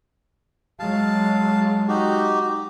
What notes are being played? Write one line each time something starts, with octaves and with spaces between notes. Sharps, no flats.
F#3 G#3 F5 A5
D#4 F#4 G4